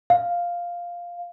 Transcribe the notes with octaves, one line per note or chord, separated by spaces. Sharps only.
F5